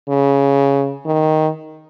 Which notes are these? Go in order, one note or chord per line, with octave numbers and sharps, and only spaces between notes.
C#3
D#3